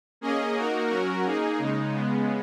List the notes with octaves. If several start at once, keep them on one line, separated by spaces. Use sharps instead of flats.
A#3 C#4 G#4 D#5
A#3 D#4 F#4 A#4
F#3 C#4 F#4 A#4
A#3 D#4 G#4
C#3 G#3 D#4
C#3 G#3 B3